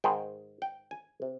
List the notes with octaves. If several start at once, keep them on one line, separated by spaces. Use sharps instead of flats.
G#2 D#3 G#3 G5
G5
G#5
C3